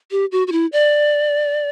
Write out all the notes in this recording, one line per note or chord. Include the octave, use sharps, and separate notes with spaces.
G4
F#4
F#4
E4
D5